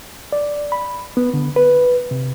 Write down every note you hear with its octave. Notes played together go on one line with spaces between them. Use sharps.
D5
B5
B3
D3
B4
C3